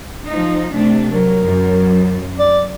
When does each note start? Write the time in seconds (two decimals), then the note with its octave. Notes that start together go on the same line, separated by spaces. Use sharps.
0.27 F3 D#4
0.72 C3 A3 D4
1.12 F#3 A#4
1.44 F#2
2.39 D5